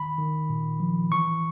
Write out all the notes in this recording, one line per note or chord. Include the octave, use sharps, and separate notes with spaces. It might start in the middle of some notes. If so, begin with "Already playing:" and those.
Already playing: D#3 B5
D#3
A#2
F3
E3 C#6